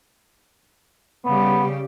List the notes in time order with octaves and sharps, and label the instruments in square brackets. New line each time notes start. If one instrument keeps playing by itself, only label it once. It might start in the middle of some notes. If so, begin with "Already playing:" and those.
[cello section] C#3 G3 G4 [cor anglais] B3